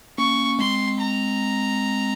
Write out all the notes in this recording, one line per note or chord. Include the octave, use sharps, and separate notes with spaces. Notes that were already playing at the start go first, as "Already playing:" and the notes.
A#3 C#4 C#6
G#3 C4 C6
A#5